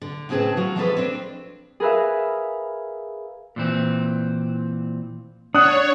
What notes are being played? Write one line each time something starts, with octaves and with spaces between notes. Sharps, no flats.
D3
A2 C#3 C4 G#4 B4 A5
F3 F#3 F#4
E3 F3 G#3 C#4 A4 B4
C4 D4
G#4 A#4 B4 E5 F5
A#2 E3 C4
D4 C#5 F#5 D#6 F#6